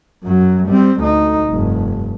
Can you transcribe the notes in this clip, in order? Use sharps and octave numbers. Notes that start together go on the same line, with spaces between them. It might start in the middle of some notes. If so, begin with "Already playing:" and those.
F#2 F#3
G3 C4
D2 D#4
F1 G2